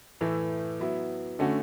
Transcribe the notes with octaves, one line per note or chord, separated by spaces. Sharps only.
A2 E3 A3 E4
F#3 B3 E4
D3 A3 C#4 F#4